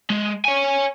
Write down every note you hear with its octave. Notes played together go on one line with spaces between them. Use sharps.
G#3
C#5 G#5